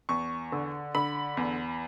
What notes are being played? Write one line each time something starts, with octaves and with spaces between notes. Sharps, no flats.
E2 C#6
D3
D3 B5
E2